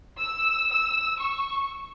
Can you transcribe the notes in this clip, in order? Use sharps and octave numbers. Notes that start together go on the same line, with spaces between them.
E6
E6
C#6